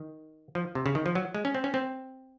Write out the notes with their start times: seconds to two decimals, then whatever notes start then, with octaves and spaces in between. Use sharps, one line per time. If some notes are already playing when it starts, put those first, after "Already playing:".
Already playing: D#3
0.55 F3
0.75 C3
0.86 C#3
0.95 D#3
1.06 F3
1.15 F#3
1.35 G#3
1.45 C#4
1.55 C4
1.64 C#4
1.74 C4